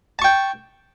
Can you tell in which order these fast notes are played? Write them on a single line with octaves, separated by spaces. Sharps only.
A5 C#6 G5